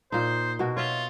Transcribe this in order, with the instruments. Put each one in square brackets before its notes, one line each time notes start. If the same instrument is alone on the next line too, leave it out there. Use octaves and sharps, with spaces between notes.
[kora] A#2 D#4 [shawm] C5
[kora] B2 F#4 A#4
[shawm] F4 [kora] C#5 D#5 E5